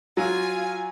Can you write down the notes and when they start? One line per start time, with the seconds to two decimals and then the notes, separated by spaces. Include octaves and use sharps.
0.17 F#3 F4 G#5